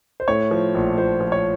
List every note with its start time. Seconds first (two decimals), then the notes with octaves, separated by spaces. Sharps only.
0.20 C5
0.28 A2 C#5
0.51 F3
0.75 A#1
0.98 A#1 C5
1.21 F3
1.32 C#5